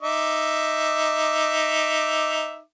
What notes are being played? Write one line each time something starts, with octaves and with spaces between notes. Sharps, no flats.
D#4 E5 D6